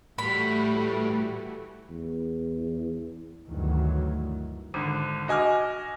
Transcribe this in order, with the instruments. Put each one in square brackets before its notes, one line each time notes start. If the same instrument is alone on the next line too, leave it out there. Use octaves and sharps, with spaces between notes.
[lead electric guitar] A2 [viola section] E3 A3 F#4 [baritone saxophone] G3 [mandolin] B5
[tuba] E2
[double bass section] D2 G2 D#3 E3 F#3
[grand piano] G#1 D3
F#4 D#5 G#5 D6 F6